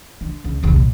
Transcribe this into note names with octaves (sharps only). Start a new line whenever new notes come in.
D3
C#2
E1 C2
A#2